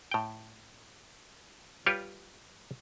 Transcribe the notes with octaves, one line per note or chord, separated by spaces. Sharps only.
A2 G5
G3 F4 G4 B4 C#5